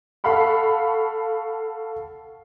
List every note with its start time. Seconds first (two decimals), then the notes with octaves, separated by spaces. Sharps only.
0.24 A4 F5 F#5 B5 C#6